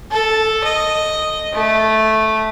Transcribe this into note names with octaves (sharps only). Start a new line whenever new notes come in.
A4
D#5
A3